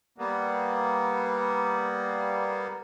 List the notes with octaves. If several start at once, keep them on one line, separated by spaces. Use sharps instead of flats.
G3 A#3 B3